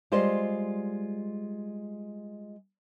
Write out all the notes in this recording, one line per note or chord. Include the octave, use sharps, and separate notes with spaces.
G3 G#3 F4 C5 D5 D#5